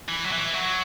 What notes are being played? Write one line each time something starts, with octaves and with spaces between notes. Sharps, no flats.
E3
F#3
E3
F#3